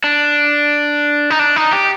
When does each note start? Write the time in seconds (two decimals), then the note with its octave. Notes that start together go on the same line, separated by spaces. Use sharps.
0.04 D4
1.30 D#4
1.39 D4
1.56 D#4
1.73 G4